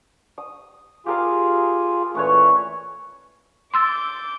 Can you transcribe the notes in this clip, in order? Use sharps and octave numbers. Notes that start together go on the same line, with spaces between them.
D#6
F4 G4 G#4 A#4 F5
A#2 E3 A3 C#4 B4 C#5
C6 D6 E6 G6 A6